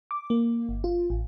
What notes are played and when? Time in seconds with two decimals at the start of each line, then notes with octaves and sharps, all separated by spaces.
0.11 D6
0.30 A#3
0.69 G1
0.84 F4
1.10 A1